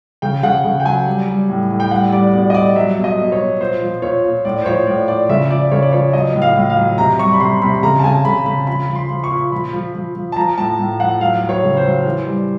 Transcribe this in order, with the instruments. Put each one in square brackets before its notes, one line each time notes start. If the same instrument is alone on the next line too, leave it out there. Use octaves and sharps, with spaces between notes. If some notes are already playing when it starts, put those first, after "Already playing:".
[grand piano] C#3 G5
C#3 F#5
C#3
G5
F#3 G#5
G3
G3
A2
A2
G5
G3 F#5
G3 D5
B2 D5
D#5
G3 D5
F#3 E5
B2
D#5
B2
C#5
B2
A#2 C5
F3
A#2 C#5
A#2
A2 D5
C5
F3 C#5
A2 D5
F3 D5
C#3 E5
F3 D5
C#3 C#5
D5
F3 C#5
F#3 D#5
A2
F5
A2
F5
F#3
C3 A#5
G3 C#6
B5
C3 C6
C3 B5
C#3 A#5
A5
C#3 G#5
C#3 B5
C#3 B5
F3 B5
F3
C6
F3
C#6
A#2
F3 B5
F3
F3
F3
A5
F3 A#5
A2 A5
A2
F3 F#5
F#3 F5
F#3
C#5
C#3
C5
F#3
E3
G3